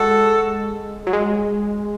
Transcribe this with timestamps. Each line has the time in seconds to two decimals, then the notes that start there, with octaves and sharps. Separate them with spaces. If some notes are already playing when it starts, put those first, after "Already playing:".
Already playing: G#3 F#4 A4
1.07 F#3
1.13 G#3